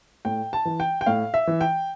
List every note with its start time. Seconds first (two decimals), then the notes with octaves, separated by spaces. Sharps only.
0.25 A2 G5
0.53 A5
0.65 E3
0.80 G5
1.01 G5
1.06 A2 F5
1.34 E5
1.47 E3
1.61 G5